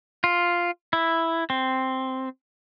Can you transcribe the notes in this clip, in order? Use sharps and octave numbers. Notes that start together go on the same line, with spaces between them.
F4
E4
C4